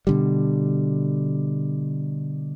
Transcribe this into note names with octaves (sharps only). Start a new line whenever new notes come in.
B2 D3 G3